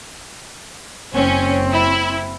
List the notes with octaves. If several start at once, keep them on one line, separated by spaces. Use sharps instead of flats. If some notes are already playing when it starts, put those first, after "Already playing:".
F#1 C4 C#4
E4